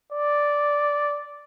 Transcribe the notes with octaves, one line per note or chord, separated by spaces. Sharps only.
D5